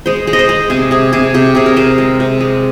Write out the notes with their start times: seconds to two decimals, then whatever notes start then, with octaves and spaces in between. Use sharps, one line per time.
0.06 G#3 C5
0.27 G#3
0.33 D#5
0.39 C5
0.49 G#3
0.70 C3 G#4
0.91 C3 G#4
1.13 C3 G#4
1.34 C3 C5
1.55 C3 G#4
1.66 A#4
1.76 C3 C5
1.98 G#3
2.20 C3
2.40 G#3